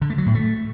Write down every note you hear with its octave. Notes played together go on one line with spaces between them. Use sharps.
D3
A3
F#3
A2
A3